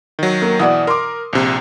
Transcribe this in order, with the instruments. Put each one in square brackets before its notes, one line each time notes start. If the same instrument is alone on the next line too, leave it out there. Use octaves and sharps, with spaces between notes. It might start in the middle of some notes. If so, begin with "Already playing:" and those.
[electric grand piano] D#3 F#3
[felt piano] A#3
[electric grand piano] B2 E3 [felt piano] D5 F#5 D#6
[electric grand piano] A#4 [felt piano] C6 D6
[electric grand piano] A#1 C3